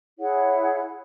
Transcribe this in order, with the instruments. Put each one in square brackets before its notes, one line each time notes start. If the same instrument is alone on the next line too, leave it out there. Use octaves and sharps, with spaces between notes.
[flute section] E4 G#4 C#5 F#5